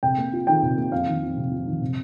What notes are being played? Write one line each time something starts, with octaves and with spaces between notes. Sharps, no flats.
C3 G5
A#3
F4
D#3 G5
C3
A#3
F2 F5
D#3
F2
C3
F2
D#3
C3